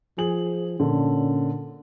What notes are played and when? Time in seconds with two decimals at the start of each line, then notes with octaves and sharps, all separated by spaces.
0.18 F3 G#4 F#7
0.80 A#2 D3 C#4